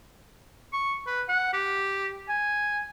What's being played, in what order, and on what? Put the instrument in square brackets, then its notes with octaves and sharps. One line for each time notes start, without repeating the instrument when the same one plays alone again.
[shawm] C#6
B4
F#5
G4
G#5